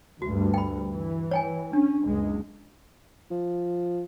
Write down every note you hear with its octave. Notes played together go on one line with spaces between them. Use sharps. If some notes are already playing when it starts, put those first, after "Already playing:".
D2 G2 F#4
G5 B5
E3
C#5 G5 G#5
C#4 D4
F#1 C#2 G#3
F3